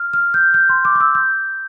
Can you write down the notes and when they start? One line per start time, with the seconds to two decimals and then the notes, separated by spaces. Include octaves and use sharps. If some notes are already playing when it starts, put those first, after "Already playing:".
Already playing: F6
0.13 F6
0.34 G6
0.54 G6
0.69 C6
0.85 D6
0.95 D6
1.00 E6
1.15 G6